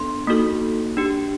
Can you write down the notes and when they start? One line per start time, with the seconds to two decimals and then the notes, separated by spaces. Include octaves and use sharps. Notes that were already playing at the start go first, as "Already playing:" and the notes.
Already playing: B3 D4 A4 C6
0.27 A#3 D#4 F#4 A4
0.97 D4 G4